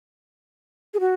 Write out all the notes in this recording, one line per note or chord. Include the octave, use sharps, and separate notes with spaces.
G#4
F#4